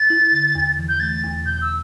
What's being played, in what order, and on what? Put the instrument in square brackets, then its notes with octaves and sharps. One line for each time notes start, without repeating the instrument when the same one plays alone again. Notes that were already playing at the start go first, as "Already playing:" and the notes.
Already playing: [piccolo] A6
[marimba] E4
D3
E2
E3
[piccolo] G6
[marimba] A3 [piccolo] A6
[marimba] E2
[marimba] B2 [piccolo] G6
[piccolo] E6